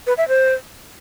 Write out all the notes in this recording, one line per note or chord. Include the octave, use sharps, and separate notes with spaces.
B4
E5
C5